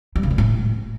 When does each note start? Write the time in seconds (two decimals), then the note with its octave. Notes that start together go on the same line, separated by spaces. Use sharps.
0.16 G3
0.23 C#3
0.31 G3
0.38 A2